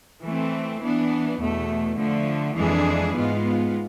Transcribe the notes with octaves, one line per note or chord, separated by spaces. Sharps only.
E3 A3 C4
E3 B3 D4
E2 B2 A3
D3 F3 A3
F2 E3 G#3 D4 G#4
G#2 G#3 B3 F4